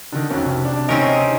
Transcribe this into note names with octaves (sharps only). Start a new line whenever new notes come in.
D3 D#3
B1 F2 F#3 C#4
C3
C3 D4
D2 D#3 C4 C#4 D#4 A#4